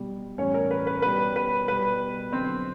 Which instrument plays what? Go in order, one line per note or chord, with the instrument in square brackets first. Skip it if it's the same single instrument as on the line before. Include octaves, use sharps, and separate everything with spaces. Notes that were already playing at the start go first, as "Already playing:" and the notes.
Already playing: [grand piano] B2 G3
A2 E3 G3 C#4 C#5
A#4
B4
B4
B2 G3 B4
B4
B2 G3 B4
D3 F#3 C4 C5